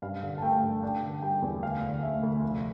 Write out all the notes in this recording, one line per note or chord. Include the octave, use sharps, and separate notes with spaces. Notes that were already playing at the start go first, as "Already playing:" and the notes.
G2 F5
D3
A5
A3 G5
G2
D4 G5
D3
G3 G5
E2
D2 F5
D3
A3 E5
D2
F1